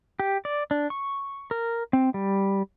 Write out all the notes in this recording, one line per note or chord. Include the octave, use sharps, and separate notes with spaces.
G4
D5
D4
C#6
A#4
C4
G3